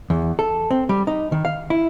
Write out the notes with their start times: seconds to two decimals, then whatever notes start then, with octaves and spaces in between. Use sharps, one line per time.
0.10 E2
0.39 A4
0.71 C4
0.89 G3
1.07 D#4
1.32 D#3
1.45 F5
1.70 E4